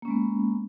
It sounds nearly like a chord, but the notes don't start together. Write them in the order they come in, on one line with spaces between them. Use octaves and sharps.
A#3 C#4 G#3 B3